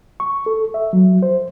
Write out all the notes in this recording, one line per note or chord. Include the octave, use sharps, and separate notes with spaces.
C#6
A4
E5
F#3
C5